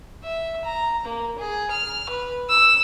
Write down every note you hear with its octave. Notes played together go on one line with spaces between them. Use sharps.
E5
A#5
A#3
G#4
F6
B4
E6